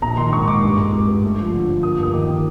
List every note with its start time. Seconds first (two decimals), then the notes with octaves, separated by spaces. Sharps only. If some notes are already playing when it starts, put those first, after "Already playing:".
0.02 A#1 A#5
0.17 D#3 C6
0.33 G#2 C#6
0.47 G#2 D6
0.63 G2
0.78 G#3
0.93 G#1
1.08 G2
1.24 A3
1.38 F3
1.53 D3
1.68 F3
1.83 A#3 D#6
1.98 G2 D#6
2.13 D#3 D6
2.29 D#3